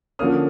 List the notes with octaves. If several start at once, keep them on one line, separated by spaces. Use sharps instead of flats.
D3 F3 A#3 C#4 D#6 F6